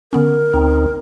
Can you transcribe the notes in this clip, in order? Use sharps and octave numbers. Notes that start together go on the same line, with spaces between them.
D3 B3 C#4 A#4
D2 C4 D#4